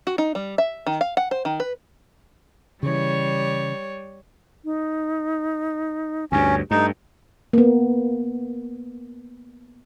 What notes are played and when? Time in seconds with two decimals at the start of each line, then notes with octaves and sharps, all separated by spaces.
0.07 F#4
0.18 D#4
0.35 G3
0.58 E5
0.87 D#3
1.01 F5
1.17 F#5
1.31 C5
1.45 D#3
1.60 B4
2.83 C#3 E3 G3 C#5
4.65 D#4
6.32 D2 G2 C#4 C#5
6.71 G2 A3 D#4
7.53 A#3 B3